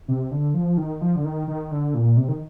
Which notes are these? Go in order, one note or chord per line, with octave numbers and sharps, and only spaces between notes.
C3
D3
F3
D#3
F3
D3
D#3
D#3
D3
A#2
C3
D#3